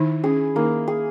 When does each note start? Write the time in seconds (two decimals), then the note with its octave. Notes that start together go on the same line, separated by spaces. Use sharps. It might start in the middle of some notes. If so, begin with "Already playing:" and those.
Already playing: D#3 D#4 E4
0.24 C#4 G#4
0.55 D#3 A#3 D#4
0.88 G#4